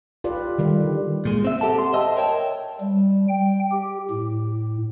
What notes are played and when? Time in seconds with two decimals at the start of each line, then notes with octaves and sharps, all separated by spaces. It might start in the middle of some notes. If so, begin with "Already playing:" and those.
0.24 F4 G4 B4 D5
0.58 D3 D#3 G3
1.25 A#2 G#3
1.45 C4 E5
1.61 G4 A4 F#5 A5
1.79 C6
1.93 C5 D#5 E5 G5 A5
2.17 A#4 C#5 G5 A5
2.80 G3
3.29 G5
3.72 G4
4.11 A2